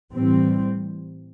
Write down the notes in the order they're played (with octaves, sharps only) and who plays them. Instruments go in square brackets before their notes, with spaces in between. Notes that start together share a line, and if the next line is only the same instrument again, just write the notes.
[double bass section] A2 E3 G3 C4